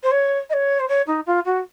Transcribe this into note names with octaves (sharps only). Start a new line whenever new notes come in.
C5
C#5
D#5
C#5
C5
C#5
D#4
F4
F#4